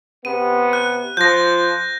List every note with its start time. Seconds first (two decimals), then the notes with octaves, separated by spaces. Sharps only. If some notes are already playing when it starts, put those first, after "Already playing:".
0.25 C3 B3 D#7
0.73 F#6
1.17 F3 G6 A#6